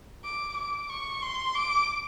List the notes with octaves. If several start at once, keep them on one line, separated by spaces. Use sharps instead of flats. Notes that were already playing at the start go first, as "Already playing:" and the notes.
D6
D6
C#6
C6
D6